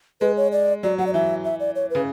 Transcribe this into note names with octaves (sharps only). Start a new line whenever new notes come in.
G#3 B4
C#5
D5
F#3 D5
F#3 F#5
D5
E3 E5
E5
D5
C#5
C#3 B4